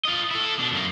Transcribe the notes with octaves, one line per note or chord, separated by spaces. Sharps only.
F4 D#5
E4 A4
B2 D4
F#2 A#3